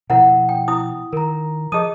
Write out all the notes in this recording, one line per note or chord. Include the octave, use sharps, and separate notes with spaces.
B2 F3 E4 A#4 F#5
G5
E4 D#6
D#3 A#4 A#5
F3 G#4 D#5 A5 D#6 D#7